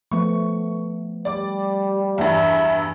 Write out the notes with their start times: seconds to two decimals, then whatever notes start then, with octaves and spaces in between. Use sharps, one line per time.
0.12 F3 A3 B3 C#6
1.25 G3 D5 D6
2.18 E2 G2 E5